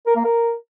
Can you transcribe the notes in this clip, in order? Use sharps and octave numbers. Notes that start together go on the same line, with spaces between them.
A#4
A#3
A#4